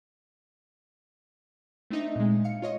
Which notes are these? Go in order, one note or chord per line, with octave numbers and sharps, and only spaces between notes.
A3 C4 D4 D#4 D#5 E5
A#2 G#3
F5 C#7
F4 C#5 D#5